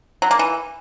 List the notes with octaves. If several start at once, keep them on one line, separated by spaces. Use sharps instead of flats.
F#3
A#3
E3